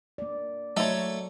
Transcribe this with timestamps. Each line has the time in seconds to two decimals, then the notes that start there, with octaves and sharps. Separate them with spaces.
0.18 A#3 D5
0.77 F#3 A3 D#4 A4 C#5